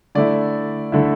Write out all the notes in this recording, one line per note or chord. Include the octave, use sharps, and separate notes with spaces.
D3 A3 E4 D5
D3 A3 E4